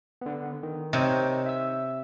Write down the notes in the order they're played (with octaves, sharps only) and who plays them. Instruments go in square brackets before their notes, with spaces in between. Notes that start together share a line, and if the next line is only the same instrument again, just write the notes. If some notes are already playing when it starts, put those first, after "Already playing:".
[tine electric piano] D3 B3
D#3
[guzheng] C3 [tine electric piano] D#4 C#5 D#5
[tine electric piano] E5 E6